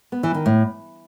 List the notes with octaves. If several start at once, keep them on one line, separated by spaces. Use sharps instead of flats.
B3
E3
D#3
A2